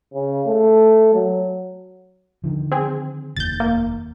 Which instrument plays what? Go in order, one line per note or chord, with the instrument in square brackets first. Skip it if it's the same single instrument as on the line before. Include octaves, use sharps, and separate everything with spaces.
[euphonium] C#3
A3
F#3
[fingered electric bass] D3 D#3 F3
[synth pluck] C4 G#4
[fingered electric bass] F1 D#2 [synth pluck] G6 A6
[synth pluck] A#3